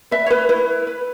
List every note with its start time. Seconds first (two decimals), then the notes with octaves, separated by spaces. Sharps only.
0.11 B4 E5
0.26 C#5
0.31 B4
0.49 E4 B4
0.87 B4